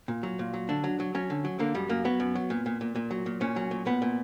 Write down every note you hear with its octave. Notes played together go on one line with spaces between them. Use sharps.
A#2
F#3
A#2
F#3
D3 D4
F#3
F#3
F#3 C#4
D3
F#3
D3 A#3
F#2 G3
F#2 A#3
F#3 B3
F#2
F#3
A#2
A#2
A#2
A#2
F#3
A#2
A#2 C#4
F#3
A#2
A#2 B3
A#2